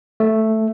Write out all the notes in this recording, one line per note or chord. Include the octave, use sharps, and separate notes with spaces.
A3